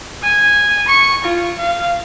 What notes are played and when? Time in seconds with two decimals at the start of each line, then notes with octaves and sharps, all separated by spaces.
0.23 G#5
0.88 C#6
1.24 F4
1.58 F5